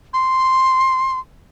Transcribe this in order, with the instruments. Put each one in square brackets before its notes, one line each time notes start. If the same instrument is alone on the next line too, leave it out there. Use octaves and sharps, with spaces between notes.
[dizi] C6